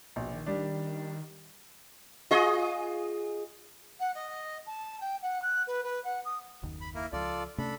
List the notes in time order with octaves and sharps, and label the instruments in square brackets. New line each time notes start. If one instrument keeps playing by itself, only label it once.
[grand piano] A#1 [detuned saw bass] B2
[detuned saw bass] D#3
[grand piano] G3 D4
[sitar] F4 G#4 D#5
[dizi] F#5
D#5
A5
G5
F#5
F#6
B4
B4
F#5
D#6
[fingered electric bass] F#1 D#2 D#3
[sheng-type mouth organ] B5
A#3 E4 A#4
[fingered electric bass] C#2 F3 [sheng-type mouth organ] F4 A4 D5
[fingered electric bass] C3 A3 C#4 [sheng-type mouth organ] D4 A4 B5